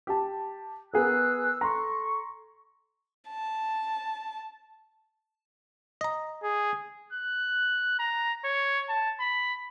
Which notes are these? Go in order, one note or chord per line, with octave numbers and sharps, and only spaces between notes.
G4 A5
B3 G#4 A#4 E6 F#6
A4 A#5 C6 C#6
A5
D#5 A#5
G#4
F#6
A#5
C#5
A5
B5